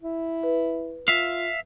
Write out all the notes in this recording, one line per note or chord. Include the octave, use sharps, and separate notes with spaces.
E4
B4
F4 E5 F5